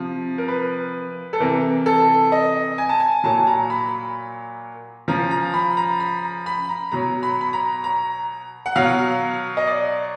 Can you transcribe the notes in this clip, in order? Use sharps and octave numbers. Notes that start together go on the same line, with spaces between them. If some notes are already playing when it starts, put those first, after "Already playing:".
Already playing: C3 F3
A#4
B4
A4
C3 E3 A#4
A4
D#5
G#5
A5
G#5
A#2 F#3 A5
A#5
B5
C#3 F3 A#5
A#5
B5
A#5
B5
A#5
B5
A#5
B2 F#3 A#5
B5
B5
A#5
A#5
F#5
B2 F#3 F5
D#5
D5